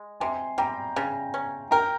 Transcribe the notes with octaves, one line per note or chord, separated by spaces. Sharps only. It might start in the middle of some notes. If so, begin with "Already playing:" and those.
Already playing: G#3
C3 G#5 C6
G3 G5 A#5
C#3
C#4
A#4 G5 A#5